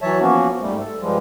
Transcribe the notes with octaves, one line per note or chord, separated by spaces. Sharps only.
E3 F#3 C#5 E5 A5
F3 A#3 B3 C#4 F#4
G#2 G3 A3
A4
G2 F3 G3 G#3